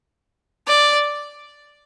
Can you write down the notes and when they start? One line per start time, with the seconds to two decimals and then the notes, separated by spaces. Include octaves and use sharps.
0.68 D5